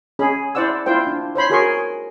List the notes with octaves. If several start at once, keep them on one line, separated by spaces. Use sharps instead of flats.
C#4 G#4 B5
E4 C5 D5 F#5 E6
E4 F4 C5 G5
D4
C5 C#5 B5 C6
F#4 G#4 A#4 C#5 C6 C#6